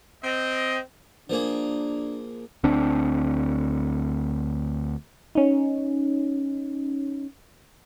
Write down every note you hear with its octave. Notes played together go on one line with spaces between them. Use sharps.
C4 D#5
F3 A#3 D4 G#4
D2 C4 D4
C#4 D#4